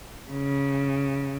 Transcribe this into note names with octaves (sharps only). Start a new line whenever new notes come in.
C#3